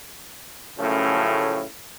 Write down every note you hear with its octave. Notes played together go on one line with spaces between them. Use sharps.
F#2 A2 C#3 F3 A3 C#4